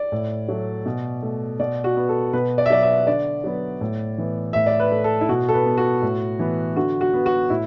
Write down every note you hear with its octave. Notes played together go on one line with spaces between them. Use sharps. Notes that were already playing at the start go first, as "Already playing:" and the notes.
Already playing: D5
A2
F#3 A3
B2
A3
B2 D5
F#4
B3
A4
B2 B4
D5
E5
F#3 B3 D5
E5
D3 D5
F#3 B3
A2
E3 B3
A2 E5
D5
B4
A3
A4
E4
B2 F#4
A4
B4
B3
F#4
A2
E3 B3
D3 F#4
F#4
B3
F#4
A2 E4